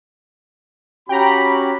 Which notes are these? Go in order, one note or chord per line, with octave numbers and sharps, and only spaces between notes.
C#4 F#4 G4 G5 A#5 B5